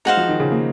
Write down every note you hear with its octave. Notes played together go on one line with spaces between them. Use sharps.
G#3 D#4 F#4 C5 F5
F3
D#3
C#3
A#3